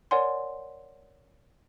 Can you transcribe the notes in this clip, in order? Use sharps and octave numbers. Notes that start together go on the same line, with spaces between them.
A#4 C#5 D5 F#5 G#5 C6